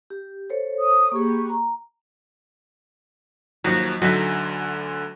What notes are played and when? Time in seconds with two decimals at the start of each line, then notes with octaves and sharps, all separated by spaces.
0.10 G4
0.50 A4 C5 C#5
0.76 D#6
1.12 A#3 G4 G#4 B4 C#6
1.49 A#5
3.64 D#2 F3 F#3 D#4 F#4
4.02 D2 D3 F#3 D#4 E5